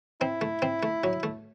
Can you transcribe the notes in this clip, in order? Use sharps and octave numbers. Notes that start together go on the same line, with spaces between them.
C4 E4
A3
C4
A3
F#3
A3